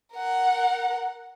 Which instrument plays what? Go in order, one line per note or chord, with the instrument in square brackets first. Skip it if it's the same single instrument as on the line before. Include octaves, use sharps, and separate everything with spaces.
[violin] A#4 F#5